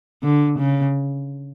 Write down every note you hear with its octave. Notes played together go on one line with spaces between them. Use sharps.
D3
C#3